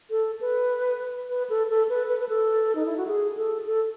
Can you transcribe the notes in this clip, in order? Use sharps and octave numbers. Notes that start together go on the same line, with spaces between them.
A4
B4
B4
A4
A4
B4
B4
B4
A4
D#4
E4
F#4
G#4
A4
A4